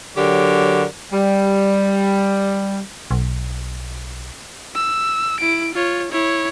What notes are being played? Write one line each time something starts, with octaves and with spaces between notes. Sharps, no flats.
D3 F#3 G4 A#4 C#5
G3
B1
E6
E4 D7
F4 C#5
E4 C#5